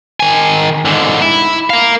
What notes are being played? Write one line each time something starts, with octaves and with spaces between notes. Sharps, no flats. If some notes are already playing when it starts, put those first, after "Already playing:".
D#3 G#5
G#2 D3
E4
A#4 F5